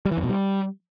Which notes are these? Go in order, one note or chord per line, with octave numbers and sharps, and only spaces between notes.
G3
E3
F2
B2
G3